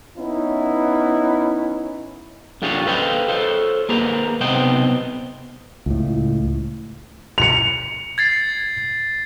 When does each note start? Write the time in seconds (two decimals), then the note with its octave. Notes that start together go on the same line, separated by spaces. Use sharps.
0.16 B3 C#4 D#4 E4
2.62 F#2 D3 F4 G4 G#4 C#5
2.86 A4 B4 C5 D#5 F5 G5
3.28 A4 C5 C#5
3.89 A#3 G#4 B4 C5 A#5
4.41 B1 C3 B3 C5 D#5 G5
5.86 C#2 A2
7.38 C#7 F7
8.18 G#6 A6 C7